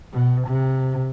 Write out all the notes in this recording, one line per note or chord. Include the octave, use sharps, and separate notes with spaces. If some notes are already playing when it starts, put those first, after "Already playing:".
B2
C3